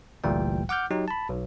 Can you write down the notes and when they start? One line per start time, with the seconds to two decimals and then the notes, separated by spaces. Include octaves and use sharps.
0.24 G1 D2 A#2 E3 G3 G5
0.69 F#5 D6 F6 G6
0.91 F#3 D#4 G4
1.08 A5 B5
1.29 B1